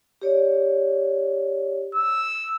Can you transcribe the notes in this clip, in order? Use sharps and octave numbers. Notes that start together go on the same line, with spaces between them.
G4 C#5 D5
E6